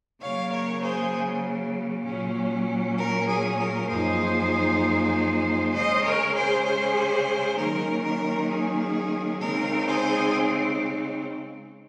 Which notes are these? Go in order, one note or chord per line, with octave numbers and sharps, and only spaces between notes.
C#3 F#3 A#3 C#5 F5
A#4 C#5
G#4 C5
A#2 F#3 C#4
A#4
G#4
A#4
F#2 F3 A#3 D#4 G#4 C5
C#3 G#3 C#4 C5 D#5
A#4 C#5
G#4 C5
G#4 C5
D#3 F#3 A#3 C#4 A#4
A#4
G#4
C#3 G#3 C4 D#4 A#4
G#4 C5